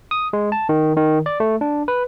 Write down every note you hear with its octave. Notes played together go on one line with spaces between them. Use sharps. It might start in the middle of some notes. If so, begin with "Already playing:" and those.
D#6
G#3
A5
D#3
D#3
D5
A3
D4
B4